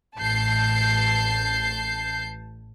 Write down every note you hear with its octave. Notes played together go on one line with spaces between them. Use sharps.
A1 A5 G6 C7